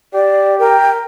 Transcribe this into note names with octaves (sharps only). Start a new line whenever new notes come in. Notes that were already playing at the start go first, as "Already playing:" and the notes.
G4 D5
A#4 G5